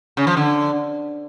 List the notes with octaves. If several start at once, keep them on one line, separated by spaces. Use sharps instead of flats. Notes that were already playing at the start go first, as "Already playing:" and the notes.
C#3
F3
D3